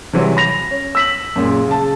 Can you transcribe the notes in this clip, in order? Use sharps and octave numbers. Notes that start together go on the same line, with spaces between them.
C3 D#3 E3 F#3 G3 C4
B5 A#6 F7
C#4
E6 B6 F#7
F#2 A#2 G#3
C#3 A5